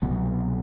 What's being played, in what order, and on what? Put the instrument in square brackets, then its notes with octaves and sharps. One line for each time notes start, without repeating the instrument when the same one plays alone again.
[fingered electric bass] C2 B2 F#3 B3